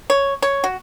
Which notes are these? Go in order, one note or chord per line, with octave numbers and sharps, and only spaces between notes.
C#5
C#5
F#4